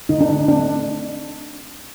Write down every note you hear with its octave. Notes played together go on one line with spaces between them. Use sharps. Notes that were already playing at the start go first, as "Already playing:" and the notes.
D3 D#4
D4
D#4
A3 C4 D4